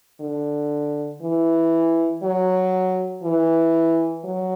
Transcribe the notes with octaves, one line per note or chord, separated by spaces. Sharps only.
D3
E3
F#3
E3
F#3